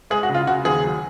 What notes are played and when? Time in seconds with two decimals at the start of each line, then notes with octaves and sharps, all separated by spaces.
0.10 G#3 G#4
0.23 F#4
0.29 C#3
0.34 F4
0.47 C#3 F#4
0.65 D#2 G#4
0.84 F#3